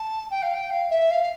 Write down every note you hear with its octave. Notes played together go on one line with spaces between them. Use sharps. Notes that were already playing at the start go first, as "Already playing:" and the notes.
Already playing: A5
G5
F5
G5
F5
E5
F5